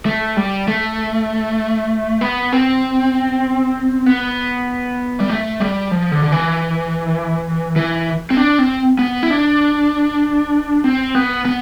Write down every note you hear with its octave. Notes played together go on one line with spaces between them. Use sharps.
A3
G3
A3
B3
C4
B3
G3
A3
G3
F3
D3
D3
E3
E3
C4
D4
C4
B3
E4
D4
C4
B3
B3